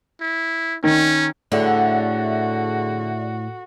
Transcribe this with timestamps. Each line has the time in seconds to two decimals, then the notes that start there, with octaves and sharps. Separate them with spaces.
0.21 E4
0.84 D#3 C#4
1.52 A2 D3 F#4 G#4 D5 E5